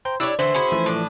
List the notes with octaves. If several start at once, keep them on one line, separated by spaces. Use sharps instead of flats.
C5 G5 A#5 G6
D4 E4 G4 C#5 E6
D3 E3 A3 E4 C5
C#4 E4 F#4 G#4 C#6
E3 F3 A3
A2 D4